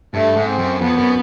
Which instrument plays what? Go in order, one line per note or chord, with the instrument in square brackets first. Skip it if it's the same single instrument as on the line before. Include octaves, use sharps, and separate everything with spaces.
[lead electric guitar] G2 [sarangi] A3
[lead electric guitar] G#2
[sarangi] C4
[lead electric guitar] F#2
[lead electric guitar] F2 [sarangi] B3
[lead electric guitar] F#2